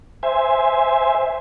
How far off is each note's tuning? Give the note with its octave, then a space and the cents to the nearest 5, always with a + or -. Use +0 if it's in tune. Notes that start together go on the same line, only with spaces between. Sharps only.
C5 +0 E5 +0 G#5 +0